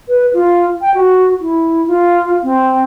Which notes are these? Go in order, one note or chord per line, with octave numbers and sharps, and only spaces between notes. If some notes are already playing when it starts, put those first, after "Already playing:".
B4
F4
G5
F#4
E4
F4
C4